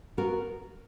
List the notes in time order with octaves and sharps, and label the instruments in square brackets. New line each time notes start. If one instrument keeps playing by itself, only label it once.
[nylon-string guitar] B3 F#4 A#4